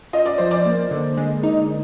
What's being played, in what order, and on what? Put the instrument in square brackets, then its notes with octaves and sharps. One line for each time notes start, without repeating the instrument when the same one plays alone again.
[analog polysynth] F4 [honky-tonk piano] D#5
[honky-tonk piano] D5
[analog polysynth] F3 [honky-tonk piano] C5
[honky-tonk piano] D5
[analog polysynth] A#3
D3
G#3
D#4